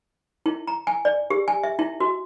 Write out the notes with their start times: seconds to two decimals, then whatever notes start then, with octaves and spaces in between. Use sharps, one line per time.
0.46 E4
0.67 A#5
0.87 G#5
1.05 D5
1.30 G4
1.48 G#5
1.63 E5
1.79 E4
2.00 F#4